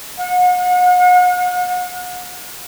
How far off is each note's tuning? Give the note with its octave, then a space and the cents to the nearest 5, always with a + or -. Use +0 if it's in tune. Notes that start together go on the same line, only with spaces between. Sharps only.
F#5 -40